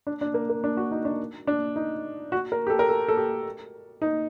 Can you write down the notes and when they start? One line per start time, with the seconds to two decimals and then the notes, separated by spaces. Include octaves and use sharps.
0.07 D4
0.21 D4
0.34 A#3
0.49 A#3
0.64 D4
0.77 F#4
0.91 D#4
1.05 D4
1.47 D4
1.76 D#4
2.32 F#4
2.52 A#4
2.67 G4
2.70 A4
2.79 A#4
2.89 A4
3.09 A4
3.17 G4
4.02 D#4